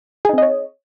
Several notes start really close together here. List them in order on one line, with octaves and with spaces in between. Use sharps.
G#4 D#4 C4 D#5 C#5